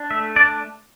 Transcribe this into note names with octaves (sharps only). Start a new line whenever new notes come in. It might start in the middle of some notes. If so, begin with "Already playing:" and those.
Already playing: D4
A3 E5
D4 D5